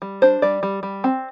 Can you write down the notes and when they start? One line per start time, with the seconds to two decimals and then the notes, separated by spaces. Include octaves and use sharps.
0.02 G3
0.22 D4 C5
0.42 G3 D5
0.63 G3
0.83 G3
1.04 C4